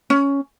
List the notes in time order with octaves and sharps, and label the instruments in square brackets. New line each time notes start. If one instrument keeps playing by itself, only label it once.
[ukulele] C#4